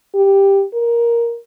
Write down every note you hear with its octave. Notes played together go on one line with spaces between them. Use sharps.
G4
A#4